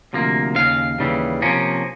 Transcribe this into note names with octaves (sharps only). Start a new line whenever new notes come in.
D2 C3 F3 A#3
D#2 C#3 F5
D#2 C#3 E3 G3
C3 F3 A#3 C#4